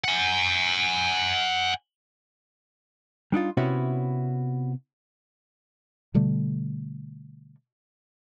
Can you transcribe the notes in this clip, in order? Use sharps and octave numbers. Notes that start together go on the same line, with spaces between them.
F#5 G#5
G3 D4 D#4 F4
C3 B3 C#4 E4 F#4 C#5
B2 D3 G3 A3